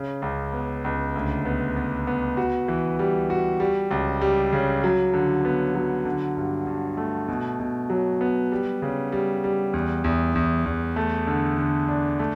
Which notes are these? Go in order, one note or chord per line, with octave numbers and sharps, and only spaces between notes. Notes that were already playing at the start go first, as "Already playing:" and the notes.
Already playing: C#3
C#2
B3
C#2
D2
B3
B3
B3
F#4
E3
G3
F#4
G3
C#2
G3
C#3
F#3
D3
B3
F#3
D3
G2
G2
A3
B2
B2
F#3
B3
G3
C#3
G3
G3
E2
E2
E2
E2
A3
D3
D3
D4
A3